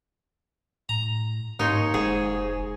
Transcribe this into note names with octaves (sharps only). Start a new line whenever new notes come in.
A2 A#5
D#2 G#2 D#4 C#5 C6
F1 G#2 G#4